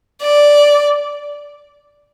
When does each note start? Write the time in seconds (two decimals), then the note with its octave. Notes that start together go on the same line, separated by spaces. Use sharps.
0.21 D5